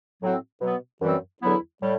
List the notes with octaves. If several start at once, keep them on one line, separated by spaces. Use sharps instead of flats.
A2 F#3 C4 F#4
B2 F#3 B3
F#2 E3 G3 C4
E2 D3 F#3 B3 E4
A2 G3